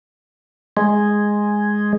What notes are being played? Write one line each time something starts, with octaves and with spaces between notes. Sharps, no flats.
G#3